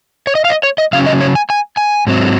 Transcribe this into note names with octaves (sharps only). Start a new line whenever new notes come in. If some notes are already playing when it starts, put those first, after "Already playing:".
C#5
D#5
F5
D#5
C#5
D#5
C#3 F#3 C#4 F5
D#5
C#5
G#5
G#5
G#5
G#2 F#3 C4